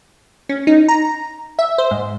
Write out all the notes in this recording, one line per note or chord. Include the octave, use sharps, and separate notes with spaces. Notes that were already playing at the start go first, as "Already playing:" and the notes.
C#4
D#4
A#5
E5
C5
G#2